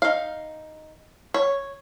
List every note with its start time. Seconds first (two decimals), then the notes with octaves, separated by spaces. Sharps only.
0.02 D#4 F5
1.34 C#5